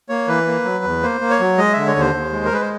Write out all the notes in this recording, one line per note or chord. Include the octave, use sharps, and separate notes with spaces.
A#3 C#5
E3 B4
A#3
F#3
E2
A#3 C5
A#3
C#5
F#3
G#3 D#5
D3 E5
C#5
D#2 C5
D#2
G#3
A#4
G#3 B4
C5